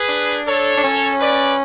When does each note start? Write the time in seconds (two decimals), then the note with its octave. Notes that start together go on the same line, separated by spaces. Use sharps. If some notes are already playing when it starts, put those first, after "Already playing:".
Already playing: G#4 B4
0.08 D4
0.46 A4 C#5
0.77 D4
0.84 C#4
1.20 B4 D5